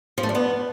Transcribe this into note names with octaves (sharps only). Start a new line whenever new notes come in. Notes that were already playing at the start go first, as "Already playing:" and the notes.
F3
A3
D4
B3